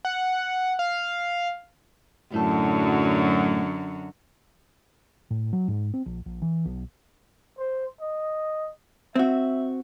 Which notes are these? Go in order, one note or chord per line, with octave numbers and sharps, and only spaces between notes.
F#5
F5
F#2 A2 D3 F#3 A4
A2
F#3
G#2
C4
A#1
A#1
E3
B1
C5
D#5
C4 F#4 E5